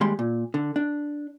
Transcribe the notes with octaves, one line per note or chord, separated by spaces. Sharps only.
D#2 G3 G#3 C6
A#2
D3
D4